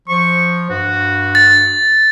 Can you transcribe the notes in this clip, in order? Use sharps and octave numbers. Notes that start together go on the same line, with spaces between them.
F3 C#6
G2 F#4
A6